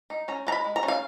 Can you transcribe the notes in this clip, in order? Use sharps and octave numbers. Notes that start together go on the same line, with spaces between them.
D#4
C#4 A#5
G#3 A#5
B5
G#3
A#5
C#4
F5